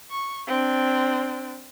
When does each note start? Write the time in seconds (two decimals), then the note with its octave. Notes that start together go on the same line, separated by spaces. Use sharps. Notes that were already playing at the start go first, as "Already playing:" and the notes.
0.11 C#6
0.47 C4 D4